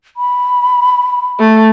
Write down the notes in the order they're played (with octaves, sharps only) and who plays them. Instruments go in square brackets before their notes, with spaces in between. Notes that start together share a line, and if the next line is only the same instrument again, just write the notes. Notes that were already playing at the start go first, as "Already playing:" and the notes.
[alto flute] B5
[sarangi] A3